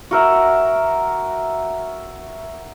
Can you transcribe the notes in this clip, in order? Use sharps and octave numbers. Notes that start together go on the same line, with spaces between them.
F#4 A#4 E5